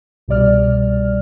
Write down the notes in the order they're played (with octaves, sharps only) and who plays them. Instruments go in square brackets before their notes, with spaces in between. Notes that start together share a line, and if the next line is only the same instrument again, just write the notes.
[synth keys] C2 B2 G3 D5 F6